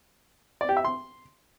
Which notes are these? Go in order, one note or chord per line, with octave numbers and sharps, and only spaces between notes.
D5
G4
E5
C6